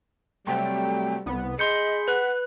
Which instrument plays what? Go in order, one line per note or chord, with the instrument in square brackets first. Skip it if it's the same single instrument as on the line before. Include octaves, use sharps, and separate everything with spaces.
[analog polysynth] C3 F#3 A3 [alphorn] G3 [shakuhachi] G5
[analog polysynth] C2 B3
[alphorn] G#4 [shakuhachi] D#5 [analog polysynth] B5 [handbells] C6 G6 C#7
[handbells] B4 F#6 [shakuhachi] F#5